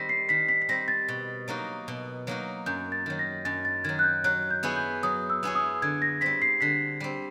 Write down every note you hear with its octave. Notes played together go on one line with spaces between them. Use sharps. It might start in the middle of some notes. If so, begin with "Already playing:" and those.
Already playing: D#3 G3 C4 A#6 B6
C7
D#3 B6
B6
B6
G3 C4 A#6
A6
B2
F#3 A#3 D#4 F#4
B2
F#3 A#3 D#4 F#4
F#2 G6
A6
D#3 F#3
A#6
F#2 A6
A6
D#3 F#3 G#6
F#6
G6
F#3 F#6
G6
B3 E4 G#4 C#5
G6
F#3 D#6
E6
B3 E4 G#4 C#5
D#6
D3 G#6
A#6
G3 C4 B6
C7
D3 B6
G3 C4